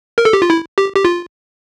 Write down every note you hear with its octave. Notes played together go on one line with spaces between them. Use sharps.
A#4
A4
G4
F4
E4
G4
G4
F4